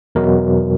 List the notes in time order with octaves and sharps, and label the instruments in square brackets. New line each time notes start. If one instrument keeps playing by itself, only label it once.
[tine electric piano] E2 B2 F#3 A#4